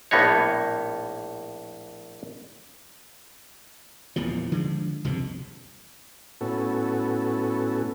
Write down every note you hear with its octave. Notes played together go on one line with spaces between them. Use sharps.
A#1 A2 A#3 B3 D#4 C#5
D#1 E2 A#2 F3
D3 F3 G#3
C2 F2 G#2 B2
A2 B3 C#4 F#4 A4